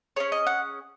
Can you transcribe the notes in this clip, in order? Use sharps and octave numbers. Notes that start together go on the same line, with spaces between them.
C#4 G#4 C#5
D#5
F#5